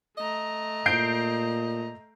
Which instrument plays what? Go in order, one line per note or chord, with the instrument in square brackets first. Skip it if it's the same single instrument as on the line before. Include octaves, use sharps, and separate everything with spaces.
[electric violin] A3 A#5 [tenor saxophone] D#5
[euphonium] A#2 [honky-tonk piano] G6 C7 D7